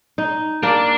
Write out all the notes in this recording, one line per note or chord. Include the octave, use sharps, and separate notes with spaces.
D#4
A#3 D4